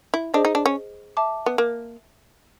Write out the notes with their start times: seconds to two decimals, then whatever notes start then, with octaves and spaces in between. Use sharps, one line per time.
0.14 E4
0.34 D4 G#4 C5 D#5
0.45 D#4
0.55 D4
0.66 C#4
1.17 E5 A5 D6
1.46 B3
1.58 A#3